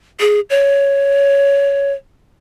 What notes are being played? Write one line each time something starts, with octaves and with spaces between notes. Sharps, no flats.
G#4
C#5